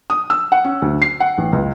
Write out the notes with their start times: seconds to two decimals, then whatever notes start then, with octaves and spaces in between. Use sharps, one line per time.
0.10 D#6
0.30 E6
0.52 F#5
0.64 C#4
0.82 D2
1.02 C7
1.20 F#5
1.38 A1
1.53 C#2